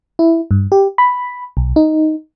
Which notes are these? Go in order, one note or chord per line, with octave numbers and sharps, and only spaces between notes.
E4
G2
G4
B5
B1
D#4